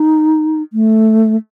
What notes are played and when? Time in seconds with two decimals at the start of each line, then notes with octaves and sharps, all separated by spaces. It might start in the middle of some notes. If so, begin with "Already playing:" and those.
Already playing: D#4
0.73 A3